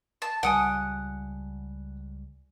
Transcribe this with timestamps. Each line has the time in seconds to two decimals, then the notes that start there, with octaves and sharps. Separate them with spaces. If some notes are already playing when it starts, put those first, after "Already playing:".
0.22 A5
0.43 C#2 G3 F#5 G#5 D#6 D7